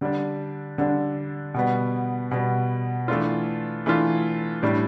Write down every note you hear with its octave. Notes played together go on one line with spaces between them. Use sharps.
D3 G3 D4
D3 G3 D4
B2 G3 B3
B2 G3 B3
E3 A3 D4 F4
E3 A3 D4 F4
A2 G3 D4